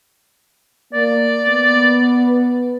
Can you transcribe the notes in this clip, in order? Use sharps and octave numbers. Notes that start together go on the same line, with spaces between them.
A#3 D5
B3